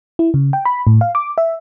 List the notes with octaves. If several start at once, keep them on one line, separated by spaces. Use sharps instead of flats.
E4
C#3
G5
B5
A2
F5
D6
E5